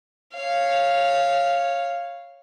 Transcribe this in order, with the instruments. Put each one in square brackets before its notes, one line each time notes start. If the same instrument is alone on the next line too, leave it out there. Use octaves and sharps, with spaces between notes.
[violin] C#5 F5